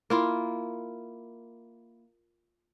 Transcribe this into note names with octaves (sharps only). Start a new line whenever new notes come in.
A#3 E4 F4